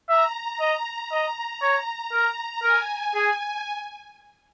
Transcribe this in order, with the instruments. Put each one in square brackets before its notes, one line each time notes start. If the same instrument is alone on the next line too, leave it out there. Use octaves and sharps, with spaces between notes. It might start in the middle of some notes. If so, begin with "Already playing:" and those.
[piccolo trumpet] E5 [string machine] A#5
[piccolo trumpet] D#5
[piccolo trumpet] D#5 [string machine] A#5
[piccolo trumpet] C#5
[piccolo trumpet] A#4 [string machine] A#5
[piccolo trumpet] A#4 [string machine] G#5
[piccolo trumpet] G#4